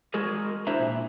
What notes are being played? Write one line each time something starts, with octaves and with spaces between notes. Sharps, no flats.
G#3 F#4 G#4 A#4 D#5
D4 E4 C5 E5 A#5
A#2